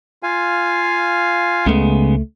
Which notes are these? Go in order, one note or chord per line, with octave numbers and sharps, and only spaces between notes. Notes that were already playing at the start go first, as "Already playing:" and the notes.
F4 F5 G#5
C#2 C#3 G#3 A3 B3